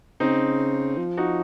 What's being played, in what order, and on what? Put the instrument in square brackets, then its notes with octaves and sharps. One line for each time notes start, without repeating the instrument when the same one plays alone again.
[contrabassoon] C#3 [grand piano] C4 D#4
[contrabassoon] F3
[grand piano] D#4 F#4